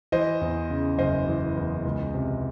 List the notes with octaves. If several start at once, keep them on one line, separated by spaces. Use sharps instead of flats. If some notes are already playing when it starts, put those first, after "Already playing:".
E3 C5 D#5
E2
C#3
F#1 C5 D#5
E3
E2
C#2
C3